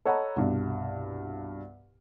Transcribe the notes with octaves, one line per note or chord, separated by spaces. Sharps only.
A4 C#5 D#5 F#5 A#5 B5
C2 G2 B2